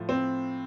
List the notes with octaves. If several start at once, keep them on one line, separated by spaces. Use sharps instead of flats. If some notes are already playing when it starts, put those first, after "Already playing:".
Already playing: A2 F3
C4